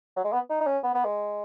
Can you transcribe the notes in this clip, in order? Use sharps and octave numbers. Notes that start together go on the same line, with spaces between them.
F#3
G#3
B3
D#4
D#4
C#4
B3
B3
G#3